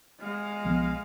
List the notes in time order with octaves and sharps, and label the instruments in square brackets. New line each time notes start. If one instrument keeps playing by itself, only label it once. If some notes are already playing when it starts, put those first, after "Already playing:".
[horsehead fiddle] G#3 F5
[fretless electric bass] B1 F3 B3